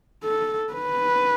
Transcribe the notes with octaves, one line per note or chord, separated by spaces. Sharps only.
A4
B4